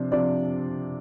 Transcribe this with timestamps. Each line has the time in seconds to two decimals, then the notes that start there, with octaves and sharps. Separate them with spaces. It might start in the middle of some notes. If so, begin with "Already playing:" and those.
Already playing: C3 F3 C4 D4
0.12 C3 F3 D4 D5